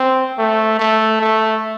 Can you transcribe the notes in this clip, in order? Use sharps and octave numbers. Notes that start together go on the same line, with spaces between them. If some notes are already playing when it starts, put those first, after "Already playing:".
Already playing: C4
A3
A3
A3